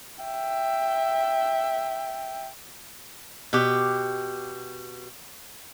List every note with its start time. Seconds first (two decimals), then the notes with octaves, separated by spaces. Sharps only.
0.24 E5 G5
3.53 B2 G4